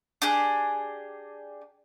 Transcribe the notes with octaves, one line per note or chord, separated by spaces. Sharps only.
D4 G4 G#4